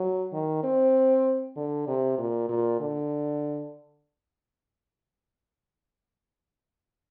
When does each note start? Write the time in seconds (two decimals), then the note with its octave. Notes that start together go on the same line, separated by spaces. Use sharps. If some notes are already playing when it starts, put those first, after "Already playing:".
Already playing: F#3
0.32 D#3
0.63 C4
1.56 D3
1.87 C3
2.18 A#2
2.49 A#2
2.80 D3